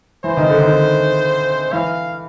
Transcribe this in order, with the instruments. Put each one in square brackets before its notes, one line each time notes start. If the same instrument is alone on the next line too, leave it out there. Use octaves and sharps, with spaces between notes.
[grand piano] E3 [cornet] C5
[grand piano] D#3
D3
D#3
[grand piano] E3 [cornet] F5